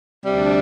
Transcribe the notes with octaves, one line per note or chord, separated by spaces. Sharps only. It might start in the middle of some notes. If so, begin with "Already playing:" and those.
D2 C3 G3 D4